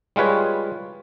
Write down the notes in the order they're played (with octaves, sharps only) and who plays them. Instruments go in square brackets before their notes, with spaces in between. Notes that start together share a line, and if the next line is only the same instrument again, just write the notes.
[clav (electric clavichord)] G3 G#3 F4 B4 C#5